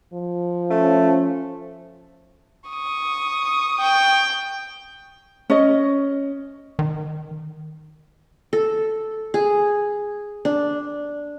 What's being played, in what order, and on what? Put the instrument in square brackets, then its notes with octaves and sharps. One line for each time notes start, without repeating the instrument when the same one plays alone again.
[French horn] F3
[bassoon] A3 [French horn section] C#4
[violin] C#6 D#6
[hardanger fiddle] G5
[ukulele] C#4 D#5
[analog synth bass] D#3
[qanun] A4
G#4
D4